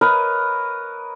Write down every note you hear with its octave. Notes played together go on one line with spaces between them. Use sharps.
A#4 B4 C#5 D#5